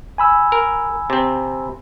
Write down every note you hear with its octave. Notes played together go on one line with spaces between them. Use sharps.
G#5 B5 E6
A#4
C3 C4